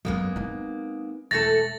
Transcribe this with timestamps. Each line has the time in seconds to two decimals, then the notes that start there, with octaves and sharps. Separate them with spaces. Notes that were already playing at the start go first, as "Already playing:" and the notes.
0.05 F#2 G#3 A#3 B3 C#4
0.36 C4 D#4
1.31 E1 E3 A3 A4 A6 A#6